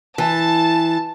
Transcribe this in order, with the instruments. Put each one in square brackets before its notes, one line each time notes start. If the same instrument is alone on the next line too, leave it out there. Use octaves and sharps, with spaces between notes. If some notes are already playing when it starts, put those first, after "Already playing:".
[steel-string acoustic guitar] E3 [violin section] A5